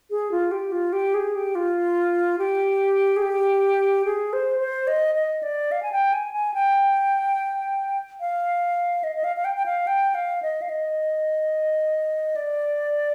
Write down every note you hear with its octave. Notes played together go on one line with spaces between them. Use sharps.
G#4
F4
G4
F4
G4
G#4
G4
F4
G4
G#4
G4
G#4
C5
C5
D#5
D#5
D5
F5
G#5
G5
G#5
G#5
G5
F5
D#5
D#5
F5
F5
G5
G5
F5
G5
F5
D#5
F5
D#5
D5